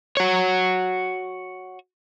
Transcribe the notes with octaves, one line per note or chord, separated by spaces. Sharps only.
F#4 C#5